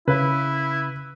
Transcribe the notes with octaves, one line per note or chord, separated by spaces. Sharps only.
C#3 E4 B4